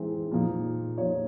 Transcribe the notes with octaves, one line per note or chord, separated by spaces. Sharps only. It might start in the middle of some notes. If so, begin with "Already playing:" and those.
Already playing: E3 G#3 C4 D#4
A#2 F3 A#3 D#4
A#2 F3 A#3 D#4 C#5